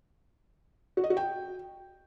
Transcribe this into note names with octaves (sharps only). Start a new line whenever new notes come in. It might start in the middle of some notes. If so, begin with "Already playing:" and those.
F#4
D#5
F#4
G5